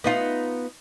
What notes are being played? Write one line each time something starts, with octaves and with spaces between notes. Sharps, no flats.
B3 D#4 F4